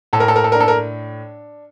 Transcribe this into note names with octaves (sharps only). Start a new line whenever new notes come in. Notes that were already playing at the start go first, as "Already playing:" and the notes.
A2 A4
A#4
A4
A#4
A4
A#4
D4
A4
A#4